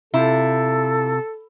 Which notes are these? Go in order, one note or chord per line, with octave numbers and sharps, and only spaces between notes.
C3 E4 F4 A4